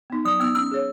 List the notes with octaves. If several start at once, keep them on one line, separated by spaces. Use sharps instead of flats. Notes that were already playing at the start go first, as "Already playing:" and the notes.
B3 D#4
F#3 D#6
B3 D#4 E6
C#4 E6
G#4 C#5